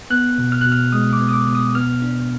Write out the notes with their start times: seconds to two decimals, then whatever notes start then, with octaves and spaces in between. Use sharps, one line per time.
0.10 B3 F#6
0.38 B2
0.52 F6
0.61 B2 F#6
0.72 F6
0.92 G#3 D#6
1.13 D6
1.20 B3
1.29 D#6
1.33 D6
1.48 B2
1.55 D#6
1.75 B3 F6
2.02 D4